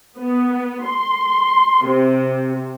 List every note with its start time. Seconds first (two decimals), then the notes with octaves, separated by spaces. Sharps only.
0.18 B3
0.85 C6
1.86 C3